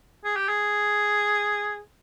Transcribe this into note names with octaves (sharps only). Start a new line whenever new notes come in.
G#4
G4
G#4